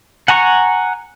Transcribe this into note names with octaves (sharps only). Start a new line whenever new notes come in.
F#5 G#5 A#5 C#6